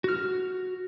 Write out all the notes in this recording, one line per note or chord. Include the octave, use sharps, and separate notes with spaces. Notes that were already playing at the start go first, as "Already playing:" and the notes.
F#4 F6